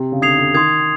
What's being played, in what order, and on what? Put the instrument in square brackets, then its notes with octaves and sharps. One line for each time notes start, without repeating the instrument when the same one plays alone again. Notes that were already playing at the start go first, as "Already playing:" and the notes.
Already playing: [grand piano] C3
C#3
[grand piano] D3 [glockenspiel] D#6 G#6 C7 F7
[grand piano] D3
[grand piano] D#3 [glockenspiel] C6 D#6 G#6